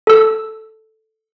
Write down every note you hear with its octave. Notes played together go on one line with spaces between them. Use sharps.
A4 E6